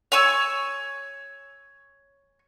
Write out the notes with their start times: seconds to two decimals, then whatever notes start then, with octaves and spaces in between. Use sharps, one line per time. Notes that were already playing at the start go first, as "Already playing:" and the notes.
0.12 C#5 G#5 C#6 E6